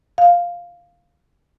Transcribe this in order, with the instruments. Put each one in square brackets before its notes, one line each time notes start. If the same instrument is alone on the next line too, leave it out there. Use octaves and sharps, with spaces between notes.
[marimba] F5